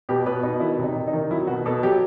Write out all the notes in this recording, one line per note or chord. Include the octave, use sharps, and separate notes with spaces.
B2 G4
B2 B4
B2 D#4
D#3 E4
C3
D#4
C3
D#4
D#3
F#3 E4
B2 F#4
B2 A4
F#3 G4